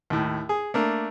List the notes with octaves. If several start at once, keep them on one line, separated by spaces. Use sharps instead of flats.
D#2 A2
G#4
A3 A#3 D4 A#4